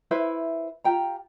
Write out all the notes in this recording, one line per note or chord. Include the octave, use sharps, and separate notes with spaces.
E4 B4 C5 E5
F4 G4 G5 A#5